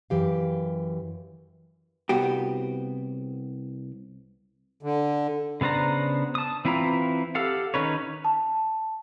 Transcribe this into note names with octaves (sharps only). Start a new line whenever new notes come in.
F#2 E3 G4 F5
C2 B3 F#4 G4
D3
C#3 B3 D4 C5 A#5
A5 D#6
E3 C4 E4 F4 A#5
G4 A4 F5 F#5
D#3 C#4 D#4 B4 C#5
A5